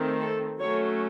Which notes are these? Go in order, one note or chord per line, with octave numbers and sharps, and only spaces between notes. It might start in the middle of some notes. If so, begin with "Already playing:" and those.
Already playing: D#3 A3 C4
A4
F#3 A3 C#4 C#5